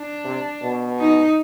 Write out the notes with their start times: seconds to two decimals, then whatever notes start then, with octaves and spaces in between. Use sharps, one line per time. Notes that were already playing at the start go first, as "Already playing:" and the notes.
Already playing: D4
0.25 C3
0.62 B2
1.00 D#4